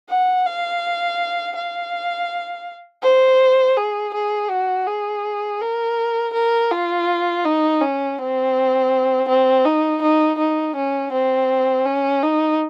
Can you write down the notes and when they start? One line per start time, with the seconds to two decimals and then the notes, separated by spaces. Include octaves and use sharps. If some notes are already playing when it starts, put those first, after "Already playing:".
0.09 F#5
0.46 F5
1.56 F5
3.03 C5
3.77 G#4
4.14 G#4
4.50 F#4
4.87 G#4
5.61 A#4
6.34 A#4
6.71 F4
7.45 D#4
7.82 C#4
8.18 C4
9.29 C4
9.65 D#4
10.02 D#4
10.38 D#4
10.76 C#4
11.13 C4
11.85 C#4
12.23 D#4